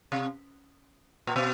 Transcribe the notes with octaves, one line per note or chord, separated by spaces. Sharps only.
C3
A#2
B2